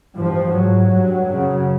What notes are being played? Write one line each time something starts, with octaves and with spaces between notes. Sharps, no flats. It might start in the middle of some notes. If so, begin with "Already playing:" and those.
G2 F3
G#2 F#3
G2
F#2 C#3